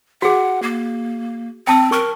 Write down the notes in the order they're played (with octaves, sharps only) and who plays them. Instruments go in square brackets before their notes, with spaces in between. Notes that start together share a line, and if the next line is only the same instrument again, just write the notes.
[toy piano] F#4 G#4 [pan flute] F#5
[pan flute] A#3
[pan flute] C4 [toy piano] G5 A5 E6
[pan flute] A#4 [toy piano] C#6